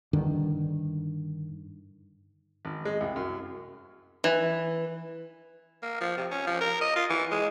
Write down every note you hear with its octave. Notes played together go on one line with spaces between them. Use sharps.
G2 D3 D#3 D4
G#1
G#3
C2
F#2
E3
A#3
F3
C3
C#4
F3
A#4
D#5
F4
E3
G#3